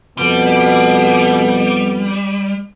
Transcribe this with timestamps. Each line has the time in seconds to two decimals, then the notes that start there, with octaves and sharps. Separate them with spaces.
0.18 F2 B2 G3 B3